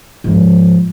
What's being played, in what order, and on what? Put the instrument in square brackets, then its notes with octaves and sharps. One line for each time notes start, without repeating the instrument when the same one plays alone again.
[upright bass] G#2 F3